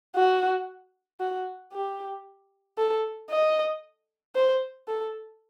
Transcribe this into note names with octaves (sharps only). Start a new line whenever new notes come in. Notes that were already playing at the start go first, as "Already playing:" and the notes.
F#4
F#4
G4
A4
D#5
C5
A4